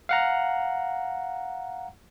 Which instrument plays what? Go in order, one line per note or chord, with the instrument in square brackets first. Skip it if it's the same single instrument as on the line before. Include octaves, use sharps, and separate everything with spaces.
[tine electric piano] F5 F#5 A#5